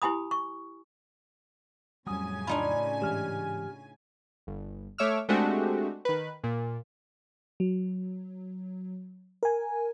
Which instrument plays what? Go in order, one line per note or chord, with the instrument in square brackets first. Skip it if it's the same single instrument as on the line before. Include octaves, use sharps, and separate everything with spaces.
[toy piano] E4 G4 G#5 B5 D#6
C#6
[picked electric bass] F2 F#3 [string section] A2 C#3 G#5 [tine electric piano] G3 D#6
[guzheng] D4 D#4 F4 [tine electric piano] B5
[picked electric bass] G#2 E3 G#3 [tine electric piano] G4 F6
[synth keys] G1
A3 C#5 E5 D6 E6 F6
G#3 A3 C4 D4 F#4 G4
D#3 B4
A#2
[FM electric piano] F#3
A#4 G#5